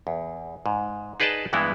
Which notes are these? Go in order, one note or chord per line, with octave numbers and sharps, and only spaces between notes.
E2
G#2
D#4 G#4 B4 D5 D#5 A5
G2 E3 G#3 B3 E4